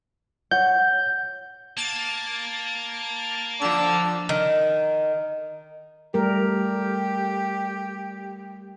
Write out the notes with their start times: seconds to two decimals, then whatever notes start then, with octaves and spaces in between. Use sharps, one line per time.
0.51 C#5 F#5 G6
1.77 A#3 A5 G#6 A6
3.62 D3 F3 D5 A5 E6
4.29 D#3
6.14 G3 A3 G4 A#4